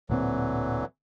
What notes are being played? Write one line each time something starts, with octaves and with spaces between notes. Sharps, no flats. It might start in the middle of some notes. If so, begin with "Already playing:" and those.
D1 A#2 D3 E3 F#3 C4